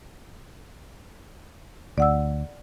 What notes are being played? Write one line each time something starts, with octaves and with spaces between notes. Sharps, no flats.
D2 D5 F#5 E6